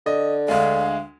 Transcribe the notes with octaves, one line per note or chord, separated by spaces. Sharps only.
D3 D#5
D2 G#3 F5